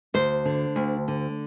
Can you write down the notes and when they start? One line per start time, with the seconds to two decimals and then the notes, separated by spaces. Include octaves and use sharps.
0.14 D2 C5
0.45 D3
0.76 D2
1.08 D3